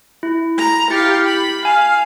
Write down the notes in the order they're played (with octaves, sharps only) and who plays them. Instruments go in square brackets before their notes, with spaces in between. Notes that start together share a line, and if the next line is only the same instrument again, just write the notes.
[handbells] E4
[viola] A#5
[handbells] E4 A6 C#7 [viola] G4 F5
[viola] B5
[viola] F5 [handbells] G#5